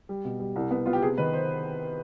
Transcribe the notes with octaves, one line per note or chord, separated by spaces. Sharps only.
G3
B2
G3
C2
B3
B3 F4
G4
C3 G#4
D#3 B4
C5